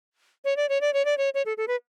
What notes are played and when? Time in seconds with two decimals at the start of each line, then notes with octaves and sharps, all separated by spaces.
0.45 C#5
0.56 D5
0.69 C#5
0.81 D5
0.93 C#5
1.05 D5
1.18 C#5
1.34 C#5
1.46 A4
1.57 A4
1.68 B4